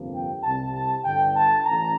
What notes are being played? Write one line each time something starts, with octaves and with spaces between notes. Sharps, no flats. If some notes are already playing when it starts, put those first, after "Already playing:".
Already playing: G1 F2 C3 F3 A#3
G5
C2 C3 G3 A5
A5
G1 G2 D3 G5
A5
A1 A#5